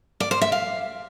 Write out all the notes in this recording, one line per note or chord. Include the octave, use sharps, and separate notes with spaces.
D5
C5
E5
F5